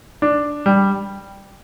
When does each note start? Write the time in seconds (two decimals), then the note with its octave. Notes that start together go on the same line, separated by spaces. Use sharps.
0.22 D4
0.66 G3